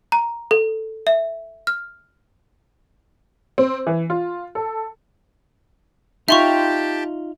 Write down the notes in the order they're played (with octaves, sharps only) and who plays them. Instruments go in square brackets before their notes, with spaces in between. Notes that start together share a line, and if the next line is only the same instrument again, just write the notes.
[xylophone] A#5
A4
E5
F6
[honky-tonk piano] C4
E3
F4
A4
[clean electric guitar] D#4 F4 [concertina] G4 G5 A5 [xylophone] E5 C6 C#6